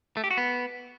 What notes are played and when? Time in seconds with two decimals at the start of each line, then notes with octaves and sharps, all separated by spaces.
0.17 A3
0.24 G4
0.31 F#4
0.37 B3